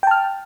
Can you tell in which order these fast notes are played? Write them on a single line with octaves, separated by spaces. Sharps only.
G5 A5 F6